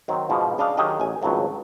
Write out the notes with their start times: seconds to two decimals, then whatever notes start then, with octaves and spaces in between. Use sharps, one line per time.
0.08 D#3 F#3 C4
0.30 G#2 B2 F3 G#3
0.58 C#3 D4 D#5 F5
0.77 D#3 F#3 G4 G#4 D#5
1.00 A1 G#5
1.22 G#1 C#2 A2 F#3 A3